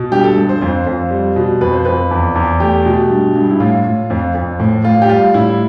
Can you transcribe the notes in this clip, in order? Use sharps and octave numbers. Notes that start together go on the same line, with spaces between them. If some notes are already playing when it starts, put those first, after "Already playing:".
Already playing: B2
G2 G4
A4
G2
C5
F2 C5
F2
G3
B2
F2 B4
C5
F2 B4
E2
E2
A3 G4
B2
G2
G2
E4
A2 F4
A2
F2
F2
A2
A2 F4
G4
G3 F4
A2 E4